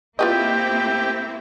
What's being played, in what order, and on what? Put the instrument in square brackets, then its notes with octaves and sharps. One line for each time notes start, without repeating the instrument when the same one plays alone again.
[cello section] A#3 C4 E4 [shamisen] F4 B4 D#5 [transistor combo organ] G4